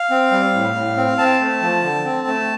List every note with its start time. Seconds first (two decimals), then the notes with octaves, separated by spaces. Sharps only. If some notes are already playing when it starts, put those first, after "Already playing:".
Already playing: F5
0.10 C4
0.31 G3
0.54 A2
0.76 A2
0.97 C4
1.18 C4 A5
1.41 A3
1.62 F3
1.83 D3
2.04 C4
2.27 A3